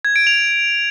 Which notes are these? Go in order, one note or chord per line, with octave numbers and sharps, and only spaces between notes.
G#6
D7
F7